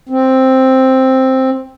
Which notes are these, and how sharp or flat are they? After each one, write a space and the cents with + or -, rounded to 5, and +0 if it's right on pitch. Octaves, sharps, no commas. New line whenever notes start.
C4 +5